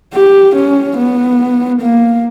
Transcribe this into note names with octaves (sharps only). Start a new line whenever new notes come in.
G4
C#4
B3
A#3